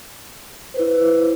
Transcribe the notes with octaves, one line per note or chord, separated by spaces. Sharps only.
E4 B4 C5